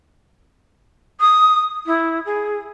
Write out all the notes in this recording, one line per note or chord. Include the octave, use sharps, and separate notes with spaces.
D#6
E4
G#4